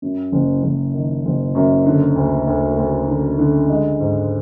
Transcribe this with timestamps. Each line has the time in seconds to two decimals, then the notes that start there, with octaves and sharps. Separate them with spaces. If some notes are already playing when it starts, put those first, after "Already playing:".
0.02 F#2
0.32 F#1
0.63 F#1
0.93 D#3
1.25 F#1
1.55 F#2
1.86 D3
2.16 D2
2.47 D2
2.77 D2
3.08 D3
3.38 D3
3.69 G#3
4.00 G#2